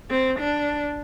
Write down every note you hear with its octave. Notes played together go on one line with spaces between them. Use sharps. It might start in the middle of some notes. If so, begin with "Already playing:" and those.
C4
D4